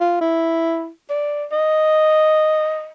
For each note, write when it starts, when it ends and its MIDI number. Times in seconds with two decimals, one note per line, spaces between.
0.01 0.16 65
0.21 0.89 64
1.10 1.45 74
1.52 2.91 75